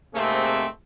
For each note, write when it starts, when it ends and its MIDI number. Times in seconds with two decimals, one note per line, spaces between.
0.14 0.66 44
0.14 0.66 48
0.14 0.66 57
0.14 0.66 58
0.14 0.66 60
0.14 0.66 68